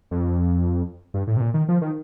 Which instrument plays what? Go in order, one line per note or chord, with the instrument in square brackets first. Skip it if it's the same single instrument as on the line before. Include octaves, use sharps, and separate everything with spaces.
[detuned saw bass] F2
G2
A2
C3
A#2
D#3
F3
D#3